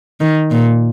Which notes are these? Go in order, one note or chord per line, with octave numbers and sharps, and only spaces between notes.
D#3
A#2